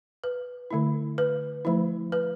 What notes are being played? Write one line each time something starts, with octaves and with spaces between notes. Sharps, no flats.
B4
D3 A3 E4
B4
F3 A3 E4
B4